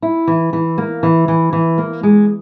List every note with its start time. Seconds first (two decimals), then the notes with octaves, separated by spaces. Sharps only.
0.02 E4
0.27 E3
0.53 E3
0.78 A#3
1.03 E3
1.28 E3
1.53 E3
1.78 A#3
2.03 G#3